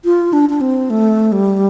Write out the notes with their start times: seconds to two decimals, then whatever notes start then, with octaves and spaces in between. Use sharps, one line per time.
0.05 F4
0.33 D4
0.50 D4
0.61 C4
0.90 A3
1.32 G3